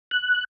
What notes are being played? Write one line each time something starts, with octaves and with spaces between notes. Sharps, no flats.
F#6